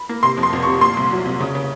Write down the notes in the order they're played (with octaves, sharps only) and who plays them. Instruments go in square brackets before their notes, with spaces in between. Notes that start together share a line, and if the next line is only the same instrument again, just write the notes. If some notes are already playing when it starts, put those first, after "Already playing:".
Already playing: [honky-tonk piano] B5
A#3
C3 C6
F2
C6
F1
C#6
C3
A#2 C6
C2
F#3
C2
C#3
C#3